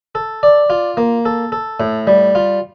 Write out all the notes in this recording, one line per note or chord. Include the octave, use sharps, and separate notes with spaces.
A4
D5
F4
A#3
A4
A4
A2
G3
F4